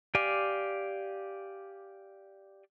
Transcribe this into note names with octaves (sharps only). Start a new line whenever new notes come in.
G4 D5 F5 G#5